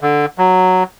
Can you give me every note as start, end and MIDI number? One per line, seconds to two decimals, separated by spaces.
0.01 0.26 50
0.38 0.83 54